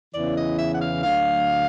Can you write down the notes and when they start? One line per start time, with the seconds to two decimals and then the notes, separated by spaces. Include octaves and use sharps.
0.14 E2 C#3 E3 D5
0.37 D#5
0.58 E5
0.75 F#5
0.82 F5
1.03 D2 D3 F#3 F5